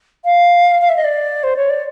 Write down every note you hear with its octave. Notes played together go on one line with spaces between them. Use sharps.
F5
F5
E5
D#5
D5
C5
C#5
D5